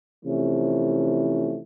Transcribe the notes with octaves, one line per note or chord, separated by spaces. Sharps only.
C3 E3 F3 A3 C#4